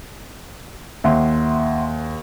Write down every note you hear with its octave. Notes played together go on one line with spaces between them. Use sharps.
D#2 E5 F#5 C6